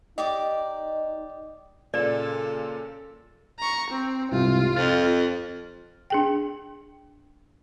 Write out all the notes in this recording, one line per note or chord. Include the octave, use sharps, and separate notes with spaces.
D#4 G4 D5 D#5 D6
A#2 C#3 F4 A4 D5 E7
A#5 C#6
C4
C2 G#2 C3 F4
F2 F6 A6
D4 G#4 G5